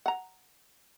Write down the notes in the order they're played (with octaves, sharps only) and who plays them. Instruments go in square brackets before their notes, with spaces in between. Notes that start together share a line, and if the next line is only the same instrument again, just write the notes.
[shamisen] F#5 A#5